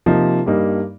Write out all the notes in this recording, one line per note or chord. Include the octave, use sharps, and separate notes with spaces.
C3 F3 A#3 D#4
G2 G3 A#3 D#4